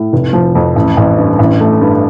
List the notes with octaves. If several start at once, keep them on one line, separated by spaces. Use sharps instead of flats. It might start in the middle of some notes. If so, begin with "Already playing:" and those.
Already playing: A2
F1
F3
F2
A1
A1
G2
A1
A3
G2